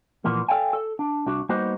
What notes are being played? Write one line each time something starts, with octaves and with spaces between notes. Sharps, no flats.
A#2 E3 F3 A#3 B3
A4 D5 F5 G5 G#5
A4
D4
C2 D4 F#4
G3 A#3 B3 D#4 F#4 C5